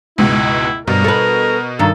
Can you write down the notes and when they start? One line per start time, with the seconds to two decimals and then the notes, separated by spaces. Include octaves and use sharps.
0.18 C#2 G#2 B2 E4
0.88 G2 B2 A#4
1.04 A4 B4
1.79 G2 D#3 A4